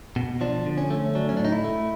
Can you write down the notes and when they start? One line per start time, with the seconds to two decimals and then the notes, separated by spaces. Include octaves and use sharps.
0.16 B2
0.41 F3 D4
0.66 D3
0.78 C#4
0.90 A3
1.15 F#3 D4
1.29 C#4
1.37 D4
1.40 A2
1.45 D#4
1.52 E4
1.64 A3